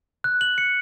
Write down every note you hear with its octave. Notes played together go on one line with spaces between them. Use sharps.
F#6
F#7
C#7